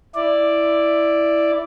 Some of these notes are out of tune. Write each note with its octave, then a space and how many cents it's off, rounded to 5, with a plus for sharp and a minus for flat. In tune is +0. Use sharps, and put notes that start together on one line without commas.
E4 +0 D5 +0